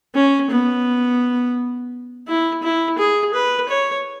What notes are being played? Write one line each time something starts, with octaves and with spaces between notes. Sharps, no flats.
C#4
B3
E4
E4
G#4
B4
C#5